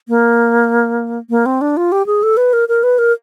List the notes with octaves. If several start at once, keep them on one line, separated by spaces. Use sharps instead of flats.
A#3
A#3
C4
D4
F4
G4
G#4
A4
B4
A#4
A#4
B4
A#4